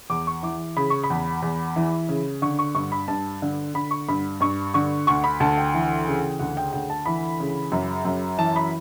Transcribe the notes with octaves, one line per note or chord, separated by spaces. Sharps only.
E2 D6
C#6
E3 D6
C#3 B5
C#6
B5
E2
E2
E3
C#3
D3 C#6
C#6
G2 C#6
B5
G2 A5
D3
D3 B5
C#6
G2 B5
G2 C#6
D3 C#6
D2 C#6
B5
D2 A5
G5
E3
C#3
D2 F#5
G5
D2 G5
A5
E3 B5
C#3
F#2
F#2
E3 A5
B5